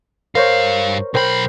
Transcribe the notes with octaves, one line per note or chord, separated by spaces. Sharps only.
G2 A#4 C5 C#5 F5
B1 A#4 C5 G5 B5